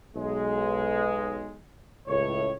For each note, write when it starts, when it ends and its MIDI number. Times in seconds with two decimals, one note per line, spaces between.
0.15 1.55 35
0.15 1.55 56
2.07 2.53 37
2.07 2.53 45
2.07 2.53 73